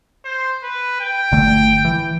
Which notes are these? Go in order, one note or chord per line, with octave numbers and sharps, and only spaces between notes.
C5
B4
G5
G1 D3 A3
E3